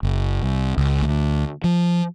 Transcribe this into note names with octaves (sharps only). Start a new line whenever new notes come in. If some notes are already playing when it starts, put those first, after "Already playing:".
F#1
C2
C#2
D2
F3